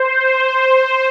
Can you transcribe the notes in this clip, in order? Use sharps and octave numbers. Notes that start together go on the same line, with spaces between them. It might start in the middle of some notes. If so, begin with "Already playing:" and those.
Already playing: C5
C5